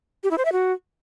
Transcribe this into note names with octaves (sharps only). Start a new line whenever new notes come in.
G4
E4
C5
E5
F#4